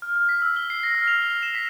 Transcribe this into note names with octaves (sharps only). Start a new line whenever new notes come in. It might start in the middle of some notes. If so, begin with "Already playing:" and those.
F6
F6
B6
E6
G7
C7
A#6
F6
F7
G7
E7
B6